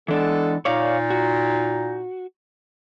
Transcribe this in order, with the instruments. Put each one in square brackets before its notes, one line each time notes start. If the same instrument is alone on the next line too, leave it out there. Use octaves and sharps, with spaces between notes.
[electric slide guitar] E3 D4 [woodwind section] G#3 B3 A4
[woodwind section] A#2 D#4 [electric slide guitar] C#5 D5 F5
[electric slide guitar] F#4